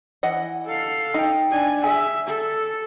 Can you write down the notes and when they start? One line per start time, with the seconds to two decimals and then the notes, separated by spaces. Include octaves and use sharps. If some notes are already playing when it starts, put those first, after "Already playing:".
0.23 E3 D#5 F#5
0.66 A4 F5
1.14 D#4 G5
1.50 D4 G#5
1.84 G#4 E5
2.27 A4